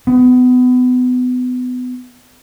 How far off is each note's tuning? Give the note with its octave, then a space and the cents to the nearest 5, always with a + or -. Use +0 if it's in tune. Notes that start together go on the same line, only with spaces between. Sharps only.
B3 +25